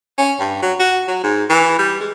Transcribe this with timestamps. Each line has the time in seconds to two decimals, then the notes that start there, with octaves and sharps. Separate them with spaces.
0.18 C#4
0.40 G2
0.62 F#3
0.80 F#4
1.08 F#3
1.23 G#2
1.50 E3
1.79 G3
2.01 G#3